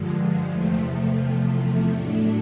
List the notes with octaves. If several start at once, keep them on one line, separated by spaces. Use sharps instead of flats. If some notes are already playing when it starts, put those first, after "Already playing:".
Already playing: G2 D3 F3 G#3
E2 C3 F3 A3
A2 F#3 A3 D4